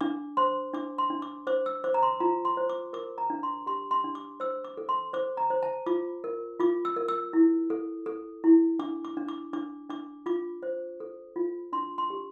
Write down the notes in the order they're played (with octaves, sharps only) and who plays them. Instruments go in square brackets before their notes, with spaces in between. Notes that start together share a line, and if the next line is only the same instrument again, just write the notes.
[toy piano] D4 D6
C5 C6
D4 D6
C6
D4
D6
C5 D6
E6
C5 D6
A#5
C6
F4 A#5
C6
C5
D6
A#4 D6
A#5
D4
C6
G4 C6
C6
D4
D6
C5 E6
D6
A4
C6
C5 D6
A#5
C5
A5
F4 D6
A#4
F4 D6
E6
A#4
E6
E4
A4
A4
E4
D4 D6
D6
D4
D6
D4 D6
D4 D6
F4 D6
C5
A4
F4
D4 C6
C6
G4